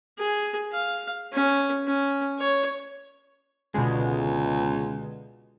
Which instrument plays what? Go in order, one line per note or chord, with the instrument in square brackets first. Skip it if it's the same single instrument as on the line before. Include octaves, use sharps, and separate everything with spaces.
[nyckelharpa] G#4
F5
C#4
C#4
C#5
[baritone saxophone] C#2 [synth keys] B2 D3 G#3